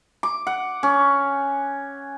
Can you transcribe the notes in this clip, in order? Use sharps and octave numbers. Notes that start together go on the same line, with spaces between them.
D6
F#5
C#4